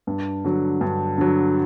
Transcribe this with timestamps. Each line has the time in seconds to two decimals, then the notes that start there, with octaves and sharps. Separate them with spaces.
0.07 G2
0.45 D3 F#3
0.81 G2
1.18 D3 F#3